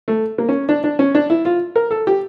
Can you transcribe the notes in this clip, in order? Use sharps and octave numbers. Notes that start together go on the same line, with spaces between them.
A3
A#3
C#4
D4
D4
C#4
D4
E4
F4
A#4
A4
G4